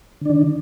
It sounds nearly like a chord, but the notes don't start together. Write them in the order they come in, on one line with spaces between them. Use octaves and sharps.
D3 D4 D#3